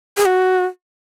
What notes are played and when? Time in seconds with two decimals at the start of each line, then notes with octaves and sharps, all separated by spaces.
0.17 G#4
0.26 F#4